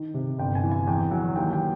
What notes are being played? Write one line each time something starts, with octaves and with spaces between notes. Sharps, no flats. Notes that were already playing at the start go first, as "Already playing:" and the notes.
Already playing: D#3
C3
G1 G5
G#5
E3
G#5
E2 G5
F#3 F#5
D#2 G5
G5